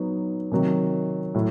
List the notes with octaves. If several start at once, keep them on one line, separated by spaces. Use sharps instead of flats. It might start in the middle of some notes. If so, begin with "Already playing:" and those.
Already playing: F#3 B3 D#4
C3 D#3 F#3
A2 F#3